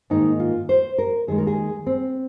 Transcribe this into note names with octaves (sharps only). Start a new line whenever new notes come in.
G#2 D#3 A#3 D#4
F4
C5
A#4
D#2 D#3 G#3 G#4
A#4
G#4
C4